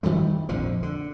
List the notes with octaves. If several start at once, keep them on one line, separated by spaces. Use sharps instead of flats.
D#3 F3 G3 A3
A#1 F2 D3 F3
D3